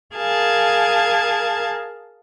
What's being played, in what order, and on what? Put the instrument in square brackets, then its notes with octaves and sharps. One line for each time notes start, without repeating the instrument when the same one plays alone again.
[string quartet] G#4 A#4 F5 A5 G#6